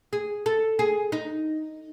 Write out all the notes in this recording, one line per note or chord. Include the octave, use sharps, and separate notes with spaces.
G#4
A4
G#4
D#4